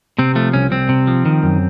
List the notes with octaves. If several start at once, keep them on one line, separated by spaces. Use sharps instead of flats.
C3 C4
F3 A3
C2 C#4
C2 C4
C3
F3
D#3
F#2